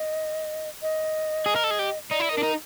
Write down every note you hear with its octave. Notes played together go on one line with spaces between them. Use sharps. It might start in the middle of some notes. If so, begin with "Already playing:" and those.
Already playing: D#5
D#5
G#4
A#4
A4
G#4
G4
D#4 D5
E4
D#4
A#4
D4
D#4